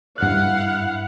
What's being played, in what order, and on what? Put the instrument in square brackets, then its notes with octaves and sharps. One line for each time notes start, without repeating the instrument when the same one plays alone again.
[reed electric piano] G2 F#6 [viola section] E4 F5 F#5